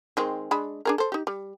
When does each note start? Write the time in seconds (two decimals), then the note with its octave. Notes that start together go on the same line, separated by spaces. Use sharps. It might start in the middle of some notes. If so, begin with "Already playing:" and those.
0.17 D#3 G#3 C4
0.51 G#3 D4 B5
0.85 D4 G#4 A#4
0.98 A4 C5
1.12 D#4 G4
1.27 G3